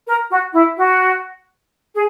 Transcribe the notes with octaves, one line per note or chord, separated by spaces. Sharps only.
A#4
F#4
E4
F#4
G#4